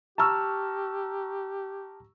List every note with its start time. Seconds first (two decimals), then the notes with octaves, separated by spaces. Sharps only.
0.18 G4 A5 A#5 C#6 E6 F6